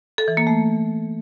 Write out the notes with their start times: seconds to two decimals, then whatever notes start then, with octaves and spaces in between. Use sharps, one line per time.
0.18 A4
0.28 E3
0.37 A#3
0.47 A3